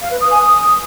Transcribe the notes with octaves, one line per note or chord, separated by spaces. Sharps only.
F5
B4
D#6
G#5
D#6